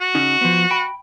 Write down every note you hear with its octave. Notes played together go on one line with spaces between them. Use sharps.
F#4
C#3 C#4 D#4
F3 B3
G5 B5